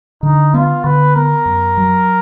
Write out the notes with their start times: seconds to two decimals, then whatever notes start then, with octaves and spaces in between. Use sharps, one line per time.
0.23 D3 D#4
0.54 B3 F4
0.84 D3 B4
1.15 B3 A#4
1.45 F#2
1.77 F#3